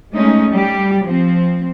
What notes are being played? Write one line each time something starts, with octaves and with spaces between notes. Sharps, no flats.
G#3 A3 C#4 D#4
G3 G4
F3 C4